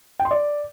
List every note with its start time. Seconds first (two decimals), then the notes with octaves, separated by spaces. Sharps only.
0.19 G5
0.25 C6
0.31 D5